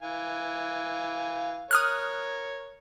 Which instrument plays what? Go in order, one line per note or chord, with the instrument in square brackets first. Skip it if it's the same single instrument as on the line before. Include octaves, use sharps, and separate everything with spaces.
[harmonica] E3 F5 G#5
[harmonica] A#4 C#5 [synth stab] D#6 F6 F#6